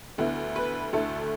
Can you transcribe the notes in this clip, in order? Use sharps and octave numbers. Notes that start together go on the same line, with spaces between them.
D2 D3 B3 E4
B4
D2 D3 A3 E4 A4